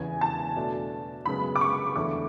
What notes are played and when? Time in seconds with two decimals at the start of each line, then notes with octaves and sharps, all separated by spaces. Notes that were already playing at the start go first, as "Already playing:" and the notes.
Already playing: E2 C#3 E3 B3 G#5
0.21 A5
0.56 B2 A3 D4
1.26 F#2 C#3 G#3 B3 B5
1.56 D6
1.61 C#6
1.96 E2 D3 A3 E4 D6